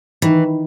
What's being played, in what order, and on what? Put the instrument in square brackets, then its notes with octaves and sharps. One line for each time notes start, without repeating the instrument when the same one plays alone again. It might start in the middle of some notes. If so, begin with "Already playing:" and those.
[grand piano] D#3 [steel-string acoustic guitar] E3